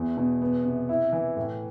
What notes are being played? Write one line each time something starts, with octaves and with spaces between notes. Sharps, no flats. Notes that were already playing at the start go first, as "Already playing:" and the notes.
Already playing: E2
B2
B3
C3
E4
E3
A2